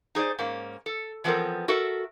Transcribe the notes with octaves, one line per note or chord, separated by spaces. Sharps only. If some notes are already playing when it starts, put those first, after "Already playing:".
D#4 G#4 C5 D5
G#2 A#3 C#4
A4
E3 F3 B3 C4 A4 A#4
F#4 A4 A#4 E5